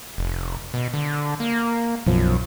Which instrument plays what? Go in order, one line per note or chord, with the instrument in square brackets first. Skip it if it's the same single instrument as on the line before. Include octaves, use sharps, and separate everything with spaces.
[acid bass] F1
B2
D3
A#3
[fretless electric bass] B1 F3 [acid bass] F#2